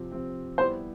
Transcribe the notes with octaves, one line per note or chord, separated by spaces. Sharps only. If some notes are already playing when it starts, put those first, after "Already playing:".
Already playing: C3 F3 C4
C3 F3 C4
G3 B3 E4 G4 C5